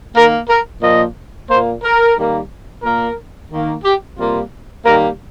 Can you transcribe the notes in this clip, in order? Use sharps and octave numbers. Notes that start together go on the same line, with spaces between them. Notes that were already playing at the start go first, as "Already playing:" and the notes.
D#3 A#3 A#4
A#4
A#2 F3 A#3 D#5
A#2 A#3 C5
A#4
D#3 G3 A#3
A#2 A#3 A#4
D#3 A#3
G4
C3 G3 A#3 F4
D#3 G3 A#3 A#4